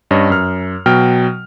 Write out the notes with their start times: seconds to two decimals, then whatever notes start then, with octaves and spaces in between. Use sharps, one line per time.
0.11 G2 C#4 C#5 D#5
0.30 F#2 F6
0.86 B2 F#3 G5 F6